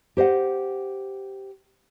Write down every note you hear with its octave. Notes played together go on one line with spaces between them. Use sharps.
G4 C5 D#5 F#5